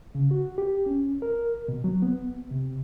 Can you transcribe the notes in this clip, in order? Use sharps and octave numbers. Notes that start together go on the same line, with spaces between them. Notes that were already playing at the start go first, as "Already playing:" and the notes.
C#3
F#4
G4
C#4
A#4
B2
F#3
B3
C3